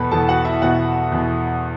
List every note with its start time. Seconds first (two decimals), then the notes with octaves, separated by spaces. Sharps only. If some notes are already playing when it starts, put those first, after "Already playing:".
Already playing: E2 B2 A4 B4 A5 B5
0.11 E2 B2 A4 A5
0.29 F#4 F#5
0.45 E4 E5
0.62 E2 B2 F#4 F#5
1.12 E2 B2